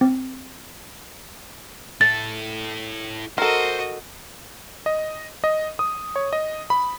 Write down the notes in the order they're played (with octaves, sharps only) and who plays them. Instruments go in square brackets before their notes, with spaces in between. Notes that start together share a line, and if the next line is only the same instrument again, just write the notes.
[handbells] C4
[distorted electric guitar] E4 A4 [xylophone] A6
[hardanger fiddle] F#4 D#5 [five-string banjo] A4 A#4 [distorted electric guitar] C5
[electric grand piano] D#5
D#5
D#6
C#5
D#5
B5